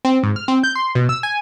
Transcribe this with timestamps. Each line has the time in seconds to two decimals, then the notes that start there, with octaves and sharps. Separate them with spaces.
0.05 C4
0.23 G#2
0.36 F6
0.48 C4
0.64 G6
0.76 C6
0.95 B2
1.09 E6
1.23 G#5